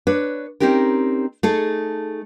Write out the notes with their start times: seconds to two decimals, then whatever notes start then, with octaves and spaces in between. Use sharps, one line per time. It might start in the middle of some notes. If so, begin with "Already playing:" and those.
0.07 D4 B4 C#5
0.60 C4 C#4 D#4 G4 A#4
1.43 A3 D#4 G#4 A4